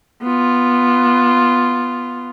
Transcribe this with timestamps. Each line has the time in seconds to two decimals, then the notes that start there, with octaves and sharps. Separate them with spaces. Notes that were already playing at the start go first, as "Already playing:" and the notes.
0.23 B3 F4